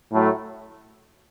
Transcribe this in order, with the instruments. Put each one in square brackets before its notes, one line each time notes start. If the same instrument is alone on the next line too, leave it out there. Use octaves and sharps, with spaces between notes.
[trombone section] A2 F#3 A3